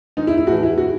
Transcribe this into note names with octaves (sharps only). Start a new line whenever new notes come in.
G#2 D#3 D#4
E4
E4
A2 E3 F#4
E4
F#4
D#3